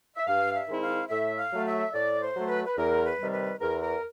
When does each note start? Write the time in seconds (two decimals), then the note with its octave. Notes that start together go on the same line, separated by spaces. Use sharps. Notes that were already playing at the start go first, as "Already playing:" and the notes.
0.16 E5
0.26 G2 F5
0.54 E5
0.68 D#3 G#3 C4 E4
0.81 F5
1.09 A2 E5
1.37 F5
1.51 F#3 A3
1.65 E5
1.93 A2 D5
2.21 C5
2.35 F#3 A3
2.48 B4
2.65 B4
2.76 E2 A#4
3.05 B4
3.18 C3 D#3 G3
3.32 B4
3.60 E2 A#4
3.81 A#4